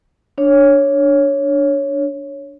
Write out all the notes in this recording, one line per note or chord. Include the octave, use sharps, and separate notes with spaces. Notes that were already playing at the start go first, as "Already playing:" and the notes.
D4 C#5